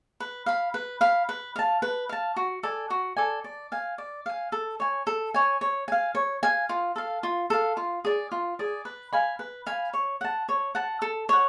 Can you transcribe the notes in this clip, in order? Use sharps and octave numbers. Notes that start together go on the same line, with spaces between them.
B4
F5 B5
B4
F5 B5
B4
F5 A5
B4
F5 A5
F#4
A4 D5 G#5
F#4
A4 D5 G#5
D5
F5 G#5
D5
F5 G#5
A4
C#5 G#5
A4
C#5 G#5
C#5
F5 G#5
C#5
F5 G#5
F4
A4 F5
F4
A4 F5
F4
G#4 D5
F4
G#4 D5
B4
F5 G#5 B5
B4
F5 G#5 B5
C#5
F#5 A5
C#5
F#5 A5
A4
C#5 F#5